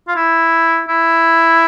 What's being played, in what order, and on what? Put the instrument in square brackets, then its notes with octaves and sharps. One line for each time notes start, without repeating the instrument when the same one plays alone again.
[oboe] F4
E4
E4